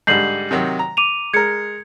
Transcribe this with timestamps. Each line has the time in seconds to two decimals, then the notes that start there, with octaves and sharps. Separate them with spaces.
0.07 G#2 D3 G3 G6 C7 F#7
0.51 C3 D#3 F#3
0.79 A#5
0.97 D6 D#7 F7
1.33 G#3 A#4 G#6 C#7